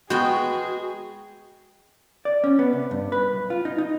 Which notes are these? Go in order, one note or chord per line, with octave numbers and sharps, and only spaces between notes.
G#3 B3 F#4 G#4 G5
D5
C#4
B3
C3
G2
B4
B1
F4
D#4
D#4